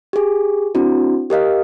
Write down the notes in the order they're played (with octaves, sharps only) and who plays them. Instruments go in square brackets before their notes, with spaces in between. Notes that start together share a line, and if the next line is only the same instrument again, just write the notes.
[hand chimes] G4 G#4
C4 D4 E4 F#4
G4 A#4 D#5 F5